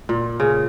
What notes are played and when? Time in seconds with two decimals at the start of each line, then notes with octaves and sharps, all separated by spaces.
0.09 A#2
0.40 C#3